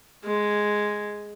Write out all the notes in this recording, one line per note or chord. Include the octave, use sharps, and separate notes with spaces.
G#3